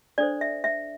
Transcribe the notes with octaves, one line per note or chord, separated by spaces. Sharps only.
D4 A4 C5 D5
E5
E5